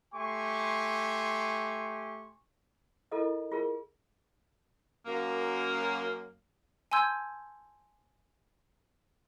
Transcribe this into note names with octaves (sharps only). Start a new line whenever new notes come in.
A3 G4 G#5 C6 C#6
E4 F4 A4 A#4 D#5
F4 G#4 A#4
F#2 A#3
G#5 A5 C6 E6 G6 G#6